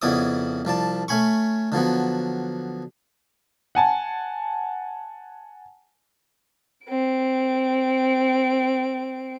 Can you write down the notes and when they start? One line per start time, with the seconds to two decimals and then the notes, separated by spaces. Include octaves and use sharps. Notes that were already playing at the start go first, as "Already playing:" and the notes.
0.02 F2 C#3 B3 E4 D5 D#6
0.65 C2 F3 D5 A5
1.08 A3 C#4 G#5 B5 C#6
1.72 D3 F3 F#3 B3
3.75 F#5 G#5 A5
6.87 C4 D7